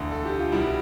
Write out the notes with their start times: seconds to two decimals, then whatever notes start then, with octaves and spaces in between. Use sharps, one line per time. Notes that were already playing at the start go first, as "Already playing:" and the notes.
Already playing: E1 D2 D3
0.12 A4
0.25 G4
0.39 F4
0.52 C2 B2 G3 E4